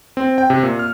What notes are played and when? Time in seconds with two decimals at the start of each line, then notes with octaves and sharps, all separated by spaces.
0.17 C4
0.38 G5
0.50 C3
0.63 A#2
0.79 F6